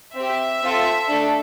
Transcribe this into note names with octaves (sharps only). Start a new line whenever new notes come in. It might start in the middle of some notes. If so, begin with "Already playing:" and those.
C4 G4 E5
C4 F4 A4
A3 D4 A4